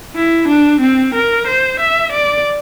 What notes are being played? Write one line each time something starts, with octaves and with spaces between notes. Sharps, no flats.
E4
D4
C4
A#4
C5
E5
D5